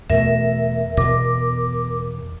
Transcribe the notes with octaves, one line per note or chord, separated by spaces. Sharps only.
E2 B2 A3 A#4 E5
E2 B2 A#4 D6